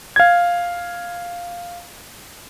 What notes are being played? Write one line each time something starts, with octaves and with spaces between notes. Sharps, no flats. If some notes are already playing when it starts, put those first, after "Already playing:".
F5 G#6